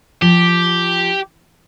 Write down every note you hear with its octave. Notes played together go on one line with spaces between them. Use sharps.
F3 G4